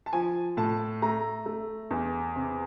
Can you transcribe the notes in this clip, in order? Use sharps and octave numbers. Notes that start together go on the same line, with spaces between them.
A5
F3 G#5
A2 A5
A3 A#5
A3
E2
C3